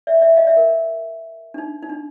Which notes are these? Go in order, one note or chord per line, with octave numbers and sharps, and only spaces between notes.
D5 E5
D5 E5
D#5 F5
D5 E5
A#4
D4
D#4
D#4
D4